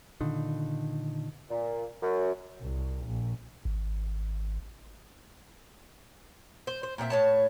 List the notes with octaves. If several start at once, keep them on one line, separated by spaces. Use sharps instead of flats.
A#2 D3 D#3
A#2
F#2
C2
A#1
G#1
C5
C5
A#2 C4 F#4 E5
A2 C#5 A5